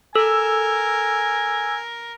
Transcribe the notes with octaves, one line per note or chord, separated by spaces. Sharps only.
A4 A#4 G#5 E6